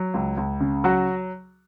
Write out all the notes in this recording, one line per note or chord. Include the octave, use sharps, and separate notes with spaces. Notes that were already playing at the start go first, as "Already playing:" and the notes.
Already playing: F#3
C#2
C#2
C#3
F#3 F#4